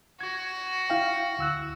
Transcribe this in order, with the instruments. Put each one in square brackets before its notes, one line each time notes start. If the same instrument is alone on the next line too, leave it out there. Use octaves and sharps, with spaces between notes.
[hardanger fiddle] F#4 [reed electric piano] G#6
[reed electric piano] E4 F5 G5
D2 E6 F#6